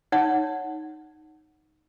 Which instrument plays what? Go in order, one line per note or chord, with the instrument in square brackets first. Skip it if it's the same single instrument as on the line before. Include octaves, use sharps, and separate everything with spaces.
[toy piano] D#4 C#5 F#5